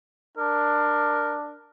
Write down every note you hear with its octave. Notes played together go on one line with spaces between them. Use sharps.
D4 A#4